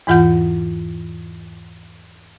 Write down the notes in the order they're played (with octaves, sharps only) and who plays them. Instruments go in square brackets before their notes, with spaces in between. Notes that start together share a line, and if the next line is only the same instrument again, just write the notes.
[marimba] E2 G#2 E3 F4 F#5 G6